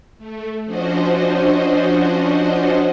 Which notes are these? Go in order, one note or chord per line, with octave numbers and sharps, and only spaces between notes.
A3
F3 C#4 D4 F#4 C5 D#5